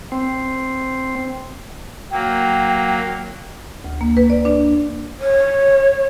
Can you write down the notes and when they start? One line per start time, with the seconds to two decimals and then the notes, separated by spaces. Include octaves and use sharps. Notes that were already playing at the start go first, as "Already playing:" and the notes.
0.12 C4
2.11 F#3 A#3 G5
3.84 D2
4.01 A#3
4.17 B4
4.30 D5
4.45 D4
5.19 C#5